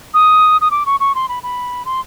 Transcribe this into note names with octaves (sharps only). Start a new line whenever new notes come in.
D#6
D#6
D6
C#6
C#6
C6
B5
B5
C6